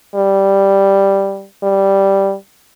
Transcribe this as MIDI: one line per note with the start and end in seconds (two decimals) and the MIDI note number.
0.15 1.45 55
1.63 2.34 55